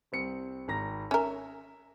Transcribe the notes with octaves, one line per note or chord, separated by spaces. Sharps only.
C2 C4 C#7
G#1 A#5 A#6
C#4 A#4 E5